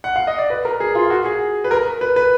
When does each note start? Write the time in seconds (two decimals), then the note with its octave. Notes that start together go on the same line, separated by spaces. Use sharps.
0.04 F#5
0.16 F5
0.27 D#5
0.38 D5
0.50 B4
0.65 A#4
0.80 G#4
0.95 F4
1.10 F#4
1.26 G#4
1.64 B4
1.71 A#4
2.01 B4
2.16 B4